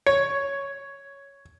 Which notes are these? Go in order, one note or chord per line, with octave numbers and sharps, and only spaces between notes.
C#5